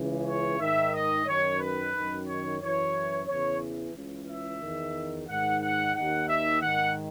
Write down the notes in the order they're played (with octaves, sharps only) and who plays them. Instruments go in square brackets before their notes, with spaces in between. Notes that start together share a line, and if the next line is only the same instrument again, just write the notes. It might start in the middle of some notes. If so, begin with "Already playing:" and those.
Already playing: [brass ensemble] C#2 C#3 E3
C#5
G#2 D#3 E5
D#5
F#2 D#3 C#5
B4
F#2 D#3
C#5
F#2 E3 C#5
E2 C#3 E3 C#5
C#2 C#3 E3
E5
E2 D#3
G#2 D#3 F#5
F#5
D#2 D#3 F#5
E5
G#2 D#3 F#5